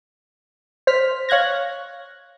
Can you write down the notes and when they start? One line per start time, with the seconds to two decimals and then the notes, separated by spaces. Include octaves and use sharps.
0.87 C5 F6 B6
1.29 C#5 F5 F#6 G#6 A#6